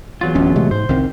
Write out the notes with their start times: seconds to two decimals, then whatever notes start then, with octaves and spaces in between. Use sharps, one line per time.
0.21 E2 F#3 F4
0.35 D1 C#4
0.56 C3 G#3 A3
0.71 G#2 C5
0.89 C2 D#3 C4